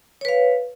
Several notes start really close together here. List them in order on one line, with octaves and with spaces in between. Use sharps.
C#5 B4 F5